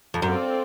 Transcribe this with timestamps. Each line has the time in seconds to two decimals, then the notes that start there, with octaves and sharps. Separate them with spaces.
0.14 F2
0.21 F#2 C4 F4 A4 D5